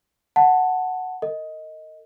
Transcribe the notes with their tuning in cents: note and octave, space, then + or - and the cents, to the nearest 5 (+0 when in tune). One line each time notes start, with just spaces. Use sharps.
F#5 +0 A5 +5
A#4 -40 D#5 +10